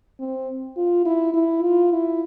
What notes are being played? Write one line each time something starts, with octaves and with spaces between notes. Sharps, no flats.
C4
F4
E4
E4
F4
E4